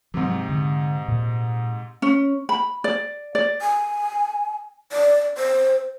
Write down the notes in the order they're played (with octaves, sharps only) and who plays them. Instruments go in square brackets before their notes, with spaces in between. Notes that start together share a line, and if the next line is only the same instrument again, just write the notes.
[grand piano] G#2 C3 [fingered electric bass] F3 F#3
[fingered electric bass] D3
A#2
[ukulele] C#4
B5
D5
D5
[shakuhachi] G#5
D5
C5